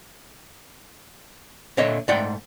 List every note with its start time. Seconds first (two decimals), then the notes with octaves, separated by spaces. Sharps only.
1.77 A#2 D3 C#5 D#5 E5
2.08 G#2 A3 D5 F#5 G5